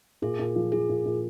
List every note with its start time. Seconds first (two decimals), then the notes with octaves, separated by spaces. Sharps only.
0.22 A#2 G#4
0.39 A#2
0.56 F3
0.72 F3 G#4
0.89 A#2
1.06 A#2